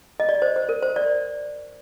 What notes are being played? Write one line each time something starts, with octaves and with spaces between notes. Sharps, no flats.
D#5
D5
C5
C5
A#4
C5
D5